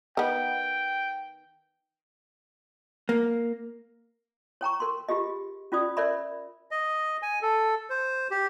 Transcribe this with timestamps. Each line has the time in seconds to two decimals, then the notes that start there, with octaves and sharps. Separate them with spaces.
0.17 D#3 B3 G5
3.09 A#3
4.61 C#5 G5 A#5 C#6
4.80 A#4 C6
5.09 F4 G4 G#4 D#5
5.72 C#4 F4 D5 D#6
5.97 A#4 C#5 D5 E5 B5
6.71 D#5
7.22 G#5
7.42 A4
7.90 C5
8.31 G4